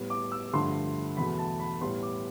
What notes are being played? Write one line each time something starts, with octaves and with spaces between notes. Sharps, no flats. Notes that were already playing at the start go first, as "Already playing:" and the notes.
Already playing: A2 G3 B3
D6
E6
G2 D3 F3 A3 C6
E2 B2 A3 B5
A5
B5
A2 G3 B3 C6
D6